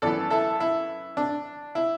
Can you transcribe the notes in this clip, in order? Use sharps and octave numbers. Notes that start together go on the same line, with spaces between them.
F#2 E3 B3 A4 D5
E4 A4
E4
D4
E4